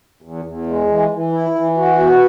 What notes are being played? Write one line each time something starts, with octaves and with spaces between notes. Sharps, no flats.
E2
E2
G#3
E3
E3
E4
E3
F#4
B3